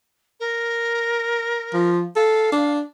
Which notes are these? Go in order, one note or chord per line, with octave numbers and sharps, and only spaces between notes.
A#4
F3
A4 F5
D4